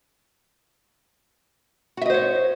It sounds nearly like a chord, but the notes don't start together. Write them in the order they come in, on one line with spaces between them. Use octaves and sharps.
F#4 E5 D#5 C5 C#5